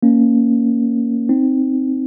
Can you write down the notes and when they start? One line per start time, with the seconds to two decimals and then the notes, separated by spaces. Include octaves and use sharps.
0.03 A#3 C#4
1.29 C4 D#4